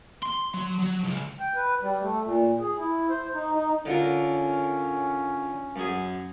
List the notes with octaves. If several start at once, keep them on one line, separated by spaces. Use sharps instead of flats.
C6
F#3
F#3
C#2
G5
B4
G3
A3
A#2
G#4
E4
C5
D#4
D#4
D3 C#4 F4 A#4
F#2 G#4